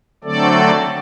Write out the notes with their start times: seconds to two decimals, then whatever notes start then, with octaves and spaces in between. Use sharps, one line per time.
0.24 D3 F#3 A3 C4 A4 D5